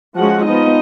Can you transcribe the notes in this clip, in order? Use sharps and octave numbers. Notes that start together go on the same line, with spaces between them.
F3 G#3 C#4 F#4 F#5
F3 B3 D#4 D#5